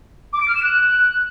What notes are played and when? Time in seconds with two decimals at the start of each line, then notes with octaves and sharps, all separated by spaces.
0.33 D6
0.40 D7
0.48 F6
0.55 E7
0.62 F#6